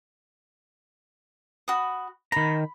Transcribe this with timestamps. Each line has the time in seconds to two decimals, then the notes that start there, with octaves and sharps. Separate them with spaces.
1.68 F#4 B5 D#6
2.32 D#3 A#5 B5